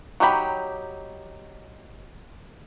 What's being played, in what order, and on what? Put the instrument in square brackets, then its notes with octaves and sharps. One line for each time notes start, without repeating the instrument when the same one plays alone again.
[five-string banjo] F#3 D#4 G4 B5